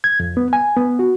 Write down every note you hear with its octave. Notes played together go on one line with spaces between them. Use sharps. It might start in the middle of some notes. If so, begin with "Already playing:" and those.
G#6
F2
B3
G#5
B3
F#4